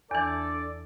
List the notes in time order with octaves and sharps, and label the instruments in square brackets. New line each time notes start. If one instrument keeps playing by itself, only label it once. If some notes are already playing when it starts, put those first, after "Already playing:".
[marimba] E2 E3 [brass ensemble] D4 A4 D5